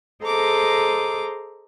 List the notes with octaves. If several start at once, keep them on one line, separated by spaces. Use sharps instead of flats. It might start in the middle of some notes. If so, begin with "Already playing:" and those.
G#4 A4 C5 D#5 A#5 D6